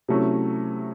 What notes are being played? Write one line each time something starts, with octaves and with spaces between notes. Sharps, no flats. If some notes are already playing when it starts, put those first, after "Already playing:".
C3 F#3 A3 C#4 E4